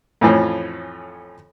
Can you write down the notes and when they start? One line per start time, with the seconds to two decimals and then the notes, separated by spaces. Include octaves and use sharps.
0.21 F2 A2 E3 F3 C#4